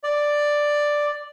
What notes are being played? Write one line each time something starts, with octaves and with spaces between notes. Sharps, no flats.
D5